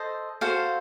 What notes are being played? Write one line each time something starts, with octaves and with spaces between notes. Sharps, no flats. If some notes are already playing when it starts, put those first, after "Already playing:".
Already playing: A4 C5 D#5
F#4 A4 C5 F5